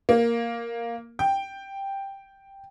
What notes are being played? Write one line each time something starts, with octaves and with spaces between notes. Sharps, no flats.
A#3
G5